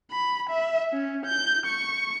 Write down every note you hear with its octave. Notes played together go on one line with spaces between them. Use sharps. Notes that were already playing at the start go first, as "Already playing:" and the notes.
B5
E5
C#4
G6
C#6